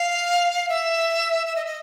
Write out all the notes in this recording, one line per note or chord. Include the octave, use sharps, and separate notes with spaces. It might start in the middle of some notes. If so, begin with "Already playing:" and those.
Already playing: F5
E5
E5
D#5
D#5